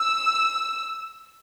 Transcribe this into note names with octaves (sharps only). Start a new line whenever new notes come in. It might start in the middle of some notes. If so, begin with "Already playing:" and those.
Already playing: E6